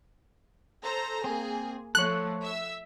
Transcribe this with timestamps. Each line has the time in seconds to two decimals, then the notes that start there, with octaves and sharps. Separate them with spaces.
0.82 A4 C5 A#5
1.24 A#3 C4 G#4
1.95 F3 A3 A4 C#5 F#6
2.42 E5 E6